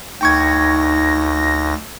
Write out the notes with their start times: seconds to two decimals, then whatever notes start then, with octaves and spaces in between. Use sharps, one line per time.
0.21 D2 D#4 G5 C#6 G#6 A#6